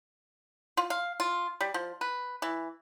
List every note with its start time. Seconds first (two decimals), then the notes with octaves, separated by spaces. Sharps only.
0.77 F4
0.90 F5
1.20 F4
1.61 G3
1.74 F3
2.01 B4
2.42 E3